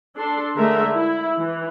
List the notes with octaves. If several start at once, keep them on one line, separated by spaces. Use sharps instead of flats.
D4 A4 C6
D3 G#3 A3 A#4 E5
E4
E3